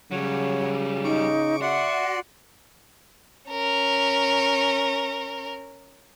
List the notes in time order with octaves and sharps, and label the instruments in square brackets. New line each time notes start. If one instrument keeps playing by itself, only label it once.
[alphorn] C#3 [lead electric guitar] F#3 G3 [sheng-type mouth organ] C#5 F#5
[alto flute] D#4 [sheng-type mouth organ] C#6 D6
[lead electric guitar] F#4 [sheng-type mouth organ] D5 F#5 C6 [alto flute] E5
[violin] C#4 A#4